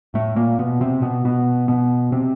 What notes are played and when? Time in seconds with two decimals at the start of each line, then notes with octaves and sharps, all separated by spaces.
0.14 A2 A3
0.36 A#2 A#3
0.59 B2 B3
0.81 C3 C4
1.02 B2 B3
1.24 B2 B3
1.68 B2 B3
2.12 C3 C4